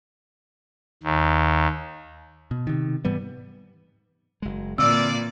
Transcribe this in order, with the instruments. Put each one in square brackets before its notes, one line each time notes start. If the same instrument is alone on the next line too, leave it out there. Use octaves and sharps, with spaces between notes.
[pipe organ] D#2
[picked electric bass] B2
C3 D#3
G#2 E3 G3 B3
[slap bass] F#1 G#3
[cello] A#2 E3 [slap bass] D3 C4 [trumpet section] F4 D5 [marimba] E6